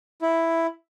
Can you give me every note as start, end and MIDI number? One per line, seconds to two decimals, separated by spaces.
0.22 0.66 64